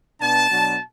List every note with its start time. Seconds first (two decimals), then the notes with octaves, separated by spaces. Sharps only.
0.21 B2 B3 D4 A5
0.50 B2 F#3 B3 D4